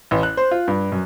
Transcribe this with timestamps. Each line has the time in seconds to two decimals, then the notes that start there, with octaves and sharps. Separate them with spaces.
0.11 A1
0.23 F#6
0.37 C5
0.51 F4
0.68 G2
0.92 F#2